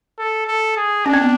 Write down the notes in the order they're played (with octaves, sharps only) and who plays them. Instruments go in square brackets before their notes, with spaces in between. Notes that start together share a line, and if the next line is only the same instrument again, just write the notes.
[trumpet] A4
A4
G#4
[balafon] C#4 [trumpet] D4
[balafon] C4
B3